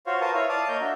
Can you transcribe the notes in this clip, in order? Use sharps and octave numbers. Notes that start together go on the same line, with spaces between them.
F4 F#4 C5 C#5 F5
F4 A#4 B4 A5 C#6 D#6
E4 C#5 F5
D5 F5 A5 D#6
A#3 C#5 D#5 G6
D4 F#4 E5